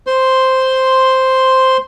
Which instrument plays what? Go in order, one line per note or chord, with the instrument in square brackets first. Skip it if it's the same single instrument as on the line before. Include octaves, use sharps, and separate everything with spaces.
[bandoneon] C5 C6